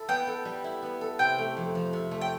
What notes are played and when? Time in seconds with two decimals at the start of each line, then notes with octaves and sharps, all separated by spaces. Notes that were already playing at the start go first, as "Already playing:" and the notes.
Already playing: E4 A4
0.08 B3 G5
0.27 A4
0.45 G3
0.64 E4
0.82 B3
1.01 A4
1.19 C3 G5
1.38 A3
1.57 F2
1.75 F3
1.93 C3
2.11 A3
2.21 G5